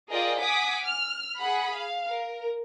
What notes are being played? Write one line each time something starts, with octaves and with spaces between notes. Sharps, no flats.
F4 G#4 A#4 D5 D#5 G5
F#5 G#5 D6 D#6 B6 D7
F6
G#4 F#5 B5
F5
A#4